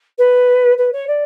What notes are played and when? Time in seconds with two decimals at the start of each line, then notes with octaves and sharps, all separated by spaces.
0.18 B4
0.77 B4
0.92 C#5
1.07 D5